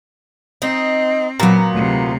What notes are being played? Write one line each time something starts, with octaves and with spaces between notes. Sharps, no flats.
C4 D#4
A#2 F#3 B3 A#5
D2 C3